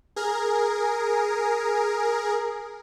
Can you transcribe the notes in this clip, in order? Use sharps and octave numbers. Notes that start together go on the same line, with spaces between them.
G#4 A#4